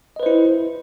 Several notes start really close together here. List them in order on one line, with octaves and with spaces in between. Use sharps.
D#5 B4 C5 E4